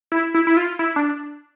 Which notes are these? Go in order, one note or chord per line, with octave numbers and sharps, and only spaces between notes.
E4
E4
E4
F4
E4
D4